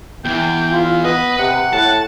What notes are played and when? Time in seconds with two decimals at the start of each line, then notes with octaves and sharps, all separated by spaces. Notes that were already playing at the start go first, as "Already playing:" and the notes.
0.25 E2 E3 G5
0.71 F4
1.04 B3 B4 D#5
1.39 C3 F#5
1.73 A2 A5